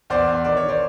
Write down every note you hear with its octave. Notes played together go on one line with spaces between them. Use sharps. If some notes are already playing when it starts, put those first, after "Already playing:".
E2 C5 D5
E2
D#3 D5
C#5
D#3
C5 D5